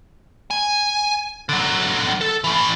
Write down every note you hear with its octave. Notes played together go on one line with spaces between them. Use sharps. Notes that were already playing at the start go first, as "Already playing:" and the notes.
G#5
D3 F#3
A4
A2 E3